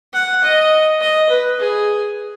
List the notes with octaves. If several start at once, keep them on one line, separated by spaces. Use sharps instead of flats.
F#5
D#5
D#5
B4
G#4